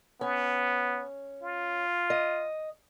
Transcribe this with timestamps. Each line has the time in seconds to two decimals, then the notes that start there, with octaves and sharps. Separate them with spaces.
0.21 B3 C#4
1.43 F4
2.10 D#5